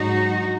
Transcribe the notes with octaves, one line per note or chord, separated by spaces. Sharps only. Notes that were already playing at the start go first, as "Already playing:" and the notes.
Already playing: G#2 F#3 D#4 F#4